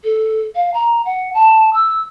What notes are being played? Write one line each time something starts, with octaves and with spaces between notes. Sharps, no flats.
A4
F5
A#5
F#5
A5
E6